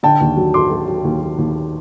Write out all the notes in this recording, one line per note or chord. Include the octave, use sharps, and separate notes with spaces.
D3 G5 A5
D#2
F#3
F#3 C6 D6
F#3
F#3
D#2
F#3
D#2